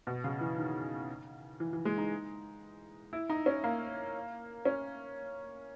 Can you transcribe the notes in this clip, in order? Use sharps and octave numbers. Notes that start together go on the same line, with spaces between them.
B2
C#3
E3
D#3
E3
E3
G#3
D#4
E4
D#4
C#4
A#3
C#4